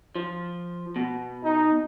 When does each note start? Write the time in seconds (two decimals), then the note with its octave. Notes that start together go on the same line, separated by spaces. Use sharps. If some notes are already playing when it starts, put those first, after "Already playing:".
0.15 F3
0.96 B2
1.44 D#4